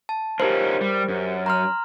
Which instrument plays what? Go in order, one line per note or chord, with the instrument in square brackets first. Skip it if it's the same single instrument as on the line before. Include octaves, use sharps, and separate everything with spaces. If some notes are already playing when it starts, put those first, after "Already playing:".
[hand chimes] A5
[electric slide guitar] C#4 D#4 F4 [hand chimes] G4 A#4 C5
[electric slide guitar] G3
F#2
[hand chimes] A#5 C6 F6